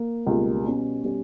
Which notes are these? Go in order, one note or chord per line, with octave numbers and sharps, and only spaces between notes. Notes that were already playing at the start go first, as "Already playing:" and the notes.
Already playing: A#3
C#2 B2 G3 A#3
B2 G3 C#4
B2 G3 C#4